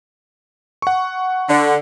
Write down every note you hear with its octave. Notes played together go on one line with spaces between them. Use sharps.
F#5 C#6
D3